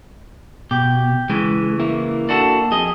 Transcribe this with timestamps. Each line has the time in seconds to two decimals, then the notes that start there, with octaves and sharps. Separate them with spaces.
0.71 B2 G4
1.30 C#3 E3 G#3
1.79 A#3 E4
2.29 D4 F#4 A4
2.72 F2 G#4 D#5